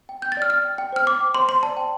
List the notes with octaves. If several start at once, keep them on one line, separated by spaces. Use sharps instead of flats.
G5
G5 G6
A6
D5 F6
G5 F6
G5
G5
C5 F6
G5 D6
G5
C5 C6
C5 C6
D5 A5
G5